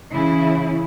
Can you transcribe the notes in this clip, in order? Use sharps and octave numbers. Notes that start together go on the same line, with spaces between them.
C#3 E3 E4